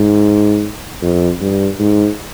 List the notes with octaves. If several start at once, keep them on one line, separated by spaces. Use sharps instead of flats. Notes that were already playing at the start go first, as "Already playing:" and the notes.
Already playing: G#2
F2
G2
G#2